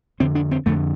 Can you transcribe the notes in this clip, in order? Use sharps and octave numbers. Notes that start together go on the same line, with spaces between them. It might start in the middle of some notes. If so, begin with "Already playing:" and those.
F2 D3 C4
D4
C4
F2 D3 A3